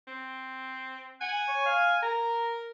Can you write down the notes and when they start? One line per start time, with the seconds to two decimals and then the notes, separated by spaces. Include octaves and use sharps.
0.08 C4
1.21 F#5 G#5
1.48 C#5
1.65 F5
2.02 A#4 A#5